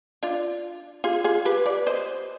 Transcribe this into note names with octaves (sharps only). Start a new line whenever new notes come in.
D4 F4
F4 G#4
F4 G#4
G4 B4
B4 D5
C5 D#5